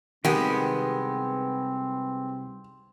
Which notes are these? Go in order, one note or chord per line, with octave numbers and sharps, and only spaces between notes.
C2 D#3 G#3 B3 C4 G4